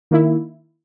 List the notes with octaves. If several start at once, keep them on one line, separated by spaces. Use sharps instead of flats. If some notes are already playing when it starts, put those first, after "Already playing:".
D#3 A#3 E4